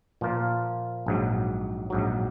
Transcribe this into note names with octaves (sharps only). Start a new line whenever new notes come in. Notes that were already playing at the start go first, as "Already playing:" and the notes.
A#2 F3 A#3 F4
A#1 G#2 F#3
A#1 G#2 F#3